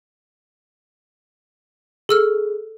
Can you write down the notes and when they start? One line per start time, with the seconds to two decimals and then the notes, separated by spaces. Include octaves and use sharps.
2.09 G#4 A4 E6 F6